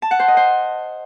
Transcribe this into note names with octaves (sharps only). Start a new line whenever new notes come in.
A5
F#5
C5
D#5
C5